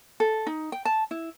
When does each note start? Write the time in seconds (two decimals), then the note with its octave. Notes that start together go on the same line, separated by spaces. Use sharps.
0.20 A4
0.47 D#4
0.72 G5
0.85 A5
1.11 E4